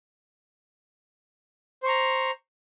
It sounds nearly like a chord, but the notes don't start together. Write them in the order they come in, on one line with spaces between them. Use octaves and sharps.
C5 C#6 A#5